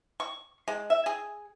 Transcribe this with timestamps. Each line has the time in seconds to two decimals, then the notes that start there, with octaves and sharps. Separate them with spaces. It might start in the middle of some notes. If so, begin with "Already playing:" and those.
0.20 C#6
0.68 G#3
0.90 E5
1.06 G#4